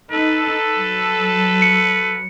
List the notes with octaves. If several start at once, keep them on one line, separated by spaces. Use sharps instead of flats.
D#4 A4 B4
F#3
C#7